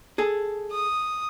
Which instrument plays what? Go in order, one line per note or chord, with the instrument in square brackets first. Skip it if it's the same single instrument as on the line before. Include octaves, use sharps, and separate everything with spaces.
[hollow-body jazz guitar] G#4 A4
[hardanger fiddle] D#6